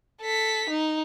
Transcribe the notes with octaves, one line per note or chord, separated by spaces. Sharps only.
A4 B6
D#4